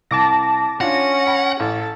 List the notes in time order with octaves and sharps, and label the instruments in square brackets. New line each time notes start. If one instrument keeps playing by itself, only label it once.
[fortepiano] C2 [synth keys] A5 D6 A#6
[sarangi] C#4 [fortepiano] D4 F4 F5 [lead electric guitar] F#5 [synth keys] A#6
[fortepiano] B5
[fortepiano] A1 [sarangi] A4